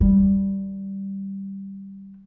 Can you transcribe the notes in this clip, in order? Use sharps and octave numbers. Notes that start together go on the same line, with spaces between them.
D#3 G3